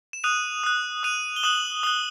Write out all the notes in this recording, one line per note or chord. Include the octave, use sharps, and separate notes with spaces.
E7
D#6 F#6 D#7 F7
D#6 F#6
D#6 F#6 D#7 F7
G7
D#6 F#6 E7 F#7
D#6 F#6 F7 G7